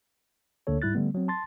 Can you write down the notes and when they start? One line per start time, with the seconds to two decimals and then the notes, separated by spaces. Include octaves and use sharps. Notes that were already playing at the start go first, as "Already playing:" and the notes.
0.67 D2 D3 A#3 A4 C#5
0.82 G#2 G3 E4 F#6 A6
0.95 D3 G3 A3 B3
1.15 F#3 C4
1.28 A5 C6 A6